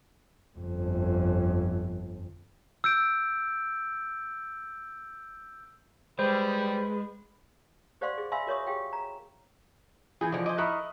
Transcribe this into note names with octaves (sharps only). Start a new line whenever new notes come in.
G1 F2
E6 G6 D7
G3 G#3 B4 C5
G4 C5 D5 F5 F#5 C6
G#4
E5 F5 G#5 B5 C6 E6
F#4 A#4 C#5 E5 C#6 D#6
G4 G#4 F5 G5
A#5
E3 G#4 G5 G#5
D3 E3 F3 D#5
C5 D#5 G#5 D6
E4 A#4 B5 C#6 D#6 F#6